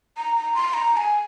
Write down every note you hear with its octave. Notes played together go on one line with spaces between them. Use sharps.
A#5
A#5
C6
A#5
A#5
G#5